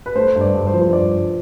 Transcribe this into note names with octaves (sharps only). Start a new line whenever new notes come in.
B4
A3 C5
G2
D5
G2
C5
F3
C5
G2 D5
G2